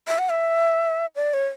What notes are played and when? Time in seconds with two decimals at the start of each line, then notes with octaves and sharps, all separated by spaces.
0.08 E5
0.19 F#5
0.30 E5
1.16 D5
1.34 C#5